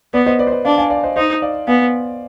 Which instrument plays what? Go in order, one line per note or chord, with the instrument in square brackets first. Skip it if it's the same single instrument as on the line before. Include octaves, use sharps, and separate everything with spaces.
[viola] B3 [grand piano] B4 D5
[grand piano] C5 D#5
B4 D5
C5
B4 D5
[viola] D4 [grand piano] D5 F5
[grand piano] F5 G#5
D5 F5
C5 D#5
[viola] D#4 [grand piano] C5 D#5
[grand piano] D5 F5
[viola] B3 [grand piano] F5 G#5